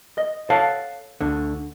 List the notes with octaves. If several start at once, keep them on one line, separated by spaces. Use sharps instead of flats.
D#5
A4 C#5 F5 F#5 A5
D2 D3